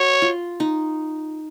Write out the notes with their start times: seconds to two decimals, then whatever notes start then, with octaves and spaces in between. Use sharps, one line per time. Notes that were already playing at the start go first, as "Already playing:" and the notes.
Already playing: F#4 C#5
0.22 F4
0.60 D#4